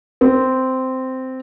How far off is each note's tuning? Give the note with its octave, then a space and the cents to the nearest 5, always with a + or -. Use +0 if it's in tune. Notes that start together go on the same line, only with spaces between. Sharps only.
C4 -10